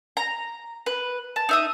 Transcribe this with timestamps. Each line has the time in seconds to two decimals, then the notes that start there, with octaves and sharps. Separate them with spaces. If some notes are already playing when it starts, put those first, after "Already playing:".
0.17 A#5
0.86 B4
1.36 A5
1.49 D#4 E5 D#6